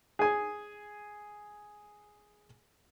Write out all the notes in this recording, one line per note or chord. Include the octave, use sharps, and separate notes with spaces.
G#4 G#5